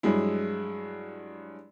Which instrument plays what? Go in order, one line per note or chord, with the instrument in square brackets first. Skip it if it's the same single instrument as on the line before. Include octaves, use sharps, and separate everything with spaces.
[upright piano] G2 F#3 G#3 E4